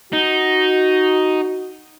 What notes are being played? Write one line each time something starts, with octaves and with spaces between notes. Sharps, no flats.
D#4 F#4